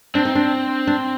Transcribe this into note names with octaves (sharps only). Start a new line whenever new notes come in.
C4 D4
D#4
D4
D4